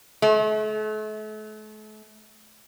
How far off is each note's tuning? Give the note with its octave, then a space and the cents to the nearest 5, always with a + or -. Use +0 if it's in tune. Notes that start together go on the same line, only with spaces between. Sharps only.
A3 -40